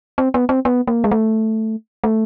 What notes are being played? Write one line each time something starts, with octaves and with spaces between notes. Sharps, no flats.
C4
B3
C4
B3
A#3
G#3
A3
A3